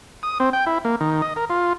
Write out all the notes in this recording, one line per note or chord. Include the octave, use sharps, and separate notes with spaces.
D#6
C4
G5
E4
A#3
D#3
D#5
A#4
F4